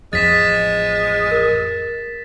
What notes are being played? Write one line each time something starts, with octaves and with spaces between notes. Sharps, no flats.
A1 F2 F3 G#3 A6 B6 E7
A#4